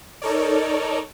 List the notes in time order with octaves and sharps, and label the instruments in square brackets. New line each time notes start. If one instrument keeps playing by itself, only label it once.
[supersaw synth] D#4 A4 A#4 C#5 D5